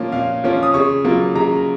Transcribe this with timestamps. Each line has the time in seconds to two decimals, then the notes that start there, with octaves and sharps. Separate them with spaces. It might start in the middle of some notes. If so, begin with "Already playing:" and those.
Already playing: A#2 F3 A#3 C#4 F4
0.12 A#2 F5
0.44 F3 A#3 C#4 F4
0.63 D#6
0.74 C#3 C#6
1.04 F#3 A#3 F4
1.35 C#3 A#5